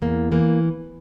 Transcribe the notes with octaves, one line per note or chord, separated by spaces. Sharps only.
E2 A#3
E3 A#3